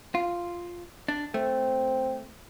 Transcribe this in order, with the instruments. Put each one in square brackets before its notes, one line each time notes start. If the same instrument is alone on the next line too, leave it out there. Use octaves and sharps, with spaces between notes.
[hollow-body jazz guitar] F4
D4
[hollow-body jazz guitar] A3 [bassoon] C4